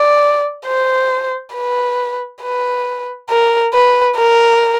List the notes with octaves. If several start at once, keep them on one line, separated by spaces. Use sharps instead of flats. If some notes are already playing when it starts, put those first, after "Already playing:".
Already playing: D5
C5
B4
B4
A#4
B4
A#4